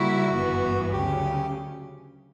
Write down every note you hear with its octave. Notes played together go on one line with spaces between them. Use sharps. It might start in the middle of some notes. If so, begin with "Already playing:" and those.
Already playing: C#3 G3 A#3 E4 F#4
G1 F#2 E3 B3
D2 C#3 F#3 C#4 G4